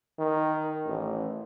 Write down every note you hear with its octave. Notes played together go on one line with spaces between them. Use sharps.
D#3
A1